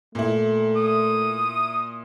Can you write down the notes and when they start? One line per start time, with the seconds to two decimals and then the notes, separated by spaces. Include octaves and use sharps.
0.15 A#2 A3 E4
0.76 D#6